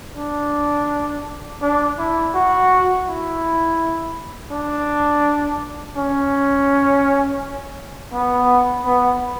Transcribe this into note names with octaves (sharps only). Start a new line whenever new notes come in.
D4
D4
E4
F#4
E4
D4
C#4
B3
B3